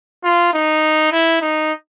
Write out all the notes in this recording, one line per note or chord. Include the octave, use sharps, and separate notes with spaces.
F4
D#4
E4
D#4